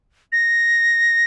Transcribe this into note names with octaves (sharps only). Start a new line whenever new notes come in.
A#6